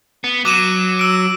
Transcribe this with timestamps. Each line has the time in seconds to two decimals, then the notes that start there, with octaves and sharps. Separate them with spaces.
0.24 B3
0.45 F#3 D6 D#7 E7
0.99 E6 D7